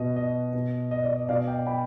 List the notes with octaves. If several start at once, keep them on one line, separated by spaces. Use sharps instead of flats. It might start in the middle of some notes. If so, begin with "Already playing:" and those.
Already playing: B2 D#5
D#5
B2
D#5
D5
D#5
B2 D5 F5
D#5 G5
G5 B5